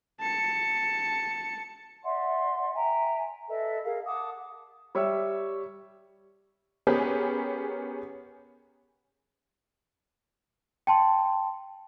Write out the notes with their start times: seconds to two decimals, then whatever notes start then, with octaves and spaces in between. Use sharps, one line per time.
0.20 A5 C#7
2.03 D5 E5 F#5 C6
2.73 E5 G5 G#5 A#5
3.48 A4 B4 D#5 E5
3.83 G#4 A#4 F5
4.04 F#5 A5 D6 D#6
4.95 G3 C#5 E5 E6
6.87 B3 C#4 G4 G#4 A#4 B4
10.87 G5 A5 C6